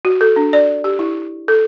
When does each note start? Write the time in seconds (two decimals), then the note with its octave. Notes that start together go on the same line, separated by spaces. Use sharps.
0.05 F#4
0.21 A4
0.36 D4
0.53 D5
0.84 G4
0.99 E4
1.48 A4